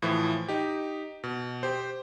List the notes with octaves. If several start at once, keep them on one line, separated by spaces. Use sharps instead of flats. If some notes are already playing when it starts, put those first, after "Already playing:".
A2 E3 F3
D#4 G4
B2
G4 C5